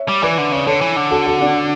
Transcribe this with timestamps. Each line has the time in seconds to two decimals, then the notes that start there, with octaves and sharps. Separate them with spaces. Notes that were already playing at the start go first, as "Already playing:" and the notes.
Already playing: C#5 E5
0.08 G3
0.22 E3 B4 D5
0.38 D3
0.52 C#3 D5
0.66 D3 A4 C#5
0.81 E3
0.96 D3
1.11 F#4 A4
1.26 F#4 A4
1.41 D4 F#4